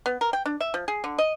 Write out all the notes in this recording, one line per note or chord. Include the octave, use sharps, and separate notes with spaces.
B3
A#4
G5
D4
E5
F3
G#4
D3
D#5